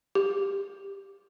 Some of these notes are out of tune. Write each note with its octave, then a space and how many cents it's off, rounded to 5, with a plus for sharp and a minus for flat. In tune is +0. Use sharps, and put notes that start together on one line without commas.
G4 +10